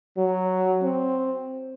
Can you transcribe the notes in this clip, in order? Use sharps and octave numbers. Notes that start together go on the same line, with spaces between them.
F#3
C4